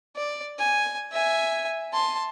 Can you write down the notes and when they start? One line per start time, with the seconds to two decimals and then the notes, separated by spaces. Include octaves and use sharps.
0.16 D5
0.59 G#5
1.12 E5 G#5
1.92 A5 C6